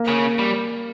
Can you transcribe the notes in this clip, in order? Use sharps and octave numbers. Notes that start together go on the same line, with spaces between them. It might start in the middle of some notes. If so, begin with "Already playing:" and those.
Already playing: A#3
C#3
G3